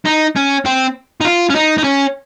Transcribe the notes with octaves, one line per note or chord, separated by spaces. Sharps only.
D#4
C#4
C4
D#4
F4
C#4
D#4
D#4
C#4